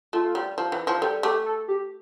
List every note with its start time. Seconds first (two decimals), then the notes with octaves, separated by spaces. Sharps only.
0.13 A3 F4
0.35 G3
0.58 F3
0.72 E3
0.87 F3
1.01 G3 A4
1.23 A3 G4
1.46 A4
1.68 G4